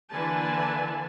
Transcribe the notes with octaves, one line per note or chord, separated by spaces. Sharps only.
D3 E3 A#3 B4 G#5 A5